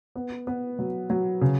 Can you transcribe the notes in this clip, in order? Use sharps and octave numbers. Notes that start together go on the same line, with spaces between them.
B3
B3
F#3
F#3
C#3